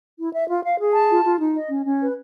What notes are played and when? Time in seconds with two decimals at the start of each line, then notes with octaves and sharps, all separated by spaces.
0.18 E4
0.33 E5
0.48 F4
0.63 F5
0.79 G#4
0.94 A5
1.09 F4
1.24 F4
1.40 D#4
1.55 D#5
1.70 C#4
1.85 C#4
2.00 B4